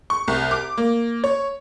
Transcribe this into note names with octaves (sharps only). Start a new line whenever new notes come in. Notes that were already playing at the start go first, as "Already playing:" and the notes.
C#6
C2
D6
A#3
C#5